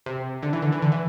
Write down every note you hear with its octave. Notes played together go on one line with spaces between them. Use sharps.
C3
D3
E3
D3
E3
D3
E3